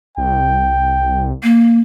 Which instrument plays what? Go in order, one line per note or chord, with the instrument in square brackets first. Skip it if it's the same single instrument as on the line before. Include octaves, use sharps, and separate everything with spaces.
[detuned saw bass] C2 [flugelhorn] G5
[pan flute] A#3